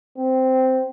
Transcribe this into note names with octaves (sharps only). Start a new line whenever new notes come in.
C4